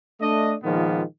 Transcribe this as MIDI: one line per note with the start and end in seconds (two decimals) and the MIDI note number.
0.21 0.54 57
0.21 0.54 62
0.21 0.54 75
0.64 1.02 46
0.64 1.02 51
0.64 1.02 53
0.64 1.02 56
0.64 1.02 58
0.64 1.02 59